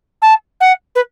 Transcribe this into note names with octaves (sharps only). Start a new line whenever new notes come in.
A5
F#5
B4